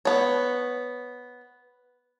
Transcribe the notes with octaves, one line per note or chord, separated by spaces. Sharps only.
B3 C#5